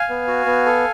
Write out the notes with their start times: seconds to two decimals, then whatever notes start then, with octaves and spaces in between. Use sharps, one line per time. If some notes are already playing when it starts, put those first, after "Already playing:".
Already playing: F5 G#5
0.09 B3
0.28 F#4
0.46 B3
0.66 A4